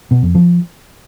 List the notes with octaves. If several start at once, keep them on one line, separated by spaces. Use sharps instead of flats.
B2
F2
F3